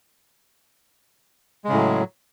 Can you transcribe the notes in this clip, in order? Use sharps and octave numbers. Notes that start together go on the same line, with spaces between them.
A2 C#3 F#3 G#3